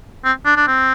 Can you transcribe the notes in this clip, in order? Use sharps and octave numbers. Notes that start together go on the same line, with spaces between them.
C4
D4
D4
C4